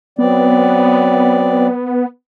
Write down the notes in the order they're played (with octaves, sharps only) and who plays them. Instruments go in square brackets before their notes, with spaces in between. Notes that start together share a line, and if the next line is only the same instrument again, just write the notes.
[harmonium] F#3 C4 D5 [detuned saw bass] B3